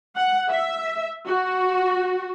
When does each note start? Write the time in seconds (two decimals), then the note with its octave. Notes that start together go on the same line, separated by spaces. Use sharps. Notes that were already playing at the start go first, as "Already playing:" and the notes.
0.16 F#5
0.50 E5
1.26 F#4